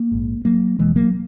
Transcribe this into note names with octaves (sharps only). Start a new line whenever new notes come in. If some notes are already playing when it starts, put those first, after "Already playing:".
Already playing: A#3
A#1 G#2
F#3 A#3
E1 E2 B2 E3 G#3
F#3 A#3